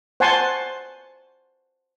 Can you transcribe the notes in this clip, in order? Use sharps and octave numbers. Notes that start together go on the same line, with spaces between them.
C5 F#5 G#5 A5 C6 C#6